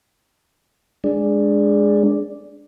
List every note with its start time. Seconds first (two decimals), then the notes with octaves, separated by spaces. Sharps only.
1.04 G#3 D4